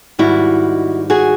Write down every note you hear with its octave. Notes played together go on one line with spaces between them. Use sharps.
G#2 D#3 G3 E4 F#4
F#4 G#4